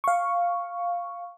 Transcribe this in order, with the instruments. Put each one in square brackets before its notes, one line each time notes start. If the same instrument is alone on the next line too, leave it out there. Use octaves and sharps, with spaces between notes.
[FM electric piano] F5 C#6